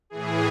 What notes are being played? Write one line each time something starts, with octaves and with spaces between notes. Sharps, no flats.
A2 E3 G#4